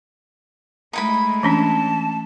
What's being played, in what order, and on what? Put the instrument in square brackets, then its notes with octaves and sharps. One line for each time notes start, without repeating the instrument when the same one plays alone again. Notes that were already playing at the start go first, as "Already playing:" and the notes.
[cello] G#3 A3 [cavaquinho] D#4 E4 B5
[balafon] E3 C#4 D4 [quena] A5